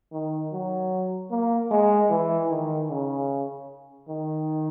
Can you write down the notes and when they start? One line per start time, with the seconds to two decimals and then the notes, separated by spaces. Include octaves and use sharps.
0.12 D#3
0.52 F#3
1.30 A#3
1.71 G#3
2.10 E3
2.49 D#3
2.90 C#3
4.08 D#3